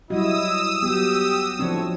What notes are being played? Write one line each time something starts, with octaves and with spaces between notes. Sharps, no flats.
F#3 G3 E4 F#4 D#5 D#6 E6
F#3 B3 F#4 G4
A2 F3 C4 D4 C#5